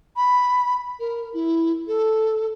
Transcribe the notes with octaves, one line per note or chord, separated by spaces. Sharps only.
B5
A#4
E4
A4